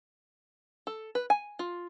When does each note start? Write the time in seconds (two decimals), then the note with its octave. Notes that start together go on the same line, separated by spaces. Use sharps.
0.87 A4
1.15 B4
1.30 G#5
1.59 F4